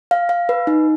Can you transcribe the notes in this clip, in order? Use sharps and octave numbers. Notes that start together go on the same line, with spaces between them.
F5
F5
B4
D#4